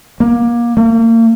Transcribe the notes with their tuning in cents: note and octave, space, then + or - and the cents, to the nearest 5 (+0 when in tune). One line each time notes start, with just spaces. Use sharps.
A#3 +25
A#3 -35